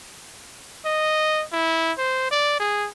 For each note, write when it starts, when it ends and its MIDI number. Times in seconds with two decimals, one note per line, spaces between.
0.86 1.45 75
1.53 1.93 64
1.98 2.30 72
2.31 2.58 74
2.60 2.88 68